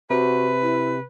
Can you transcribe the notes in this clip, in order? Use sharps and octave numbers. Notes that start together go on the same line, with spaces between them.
C3 F#4 B4
E4